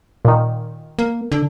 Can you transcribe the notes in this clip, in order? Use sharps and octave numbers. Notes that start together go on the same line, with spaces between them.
A#2 D#3
A#3
D3